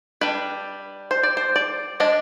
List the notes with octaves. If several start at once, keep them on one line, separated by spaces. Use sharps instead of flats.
G3 D4 B4
C5
D5
C5
D5
G#3 D4 D#5